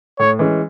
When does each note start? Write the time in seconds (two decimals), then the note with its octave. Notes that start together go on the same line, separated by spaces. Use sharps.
0.19 A2 C#5
0.39 E3 G#3 C#4